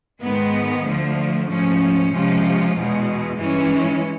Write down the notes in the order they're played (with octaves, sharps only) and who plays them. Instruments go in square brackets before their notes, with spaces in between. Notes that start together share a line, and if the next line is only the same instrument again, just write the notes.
[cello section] G#2 D#3 G#3 B3
D2 D3 F3 A3
G#2 F3 A3 C#4
C3 F3 G#3 C#4 F4
E2 B2 G#3
G2 E3 G#3 C#4